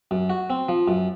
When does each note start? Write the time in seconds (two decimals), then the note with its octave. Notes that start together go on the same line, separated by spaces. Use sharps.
0.11 F#2
0.30 F#4
0.50 C4
0.69 F3
0.88 F#2